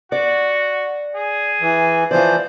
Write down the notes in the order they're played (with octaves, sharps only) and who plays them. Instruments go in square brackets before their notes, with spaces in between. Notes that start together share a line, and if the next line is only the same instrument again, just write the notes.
[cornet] F#4 [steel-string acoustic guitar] D5
[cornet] G#4
[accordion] E3
[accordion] E3 F3 C5 [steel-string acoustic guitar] D5 F5